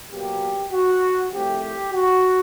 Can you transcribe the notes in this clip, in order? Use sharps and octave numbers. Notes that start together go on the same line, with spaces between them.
B2 F#3 A#3 G4
F#4
C2 C3 F3 A3 G4
F#4